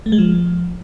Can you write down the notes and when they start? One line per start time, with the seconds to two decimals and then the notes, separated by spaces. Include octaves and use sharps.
0.06 A3
0.12 G#3
0.18 F3